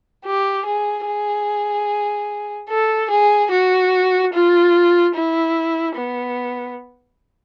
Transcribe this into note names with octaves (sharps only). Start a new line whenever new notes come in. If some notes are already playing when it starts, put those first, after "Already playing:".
G4
G#4
G#4
A4
G#4
F#4
F4
E4
B3